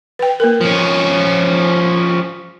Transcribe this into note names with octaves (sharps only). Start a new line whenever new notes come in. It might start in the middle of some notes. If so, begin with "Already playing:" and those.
B4 G5
A#3 A#4
F3 C#4